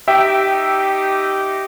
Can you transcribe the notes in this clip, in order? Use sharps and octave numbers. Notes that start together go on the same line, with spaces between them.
D#4 G4 E5 G5